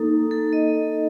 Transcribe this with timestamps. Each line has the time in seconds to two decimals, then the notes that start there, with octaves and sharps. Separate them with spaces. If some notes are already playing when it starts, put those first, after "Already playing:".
Already playing: A#3 D#4 A4
0.31 A4
0.53 D#5